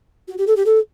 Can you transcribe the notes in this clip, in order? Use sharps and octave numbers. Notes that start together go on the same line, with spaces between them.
F#4
G4
A4
G4
A4